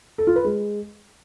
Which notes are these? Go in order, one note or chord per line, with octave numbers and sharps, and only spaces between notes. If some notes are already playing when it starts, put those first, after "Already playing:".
A4
F4
B4
G#3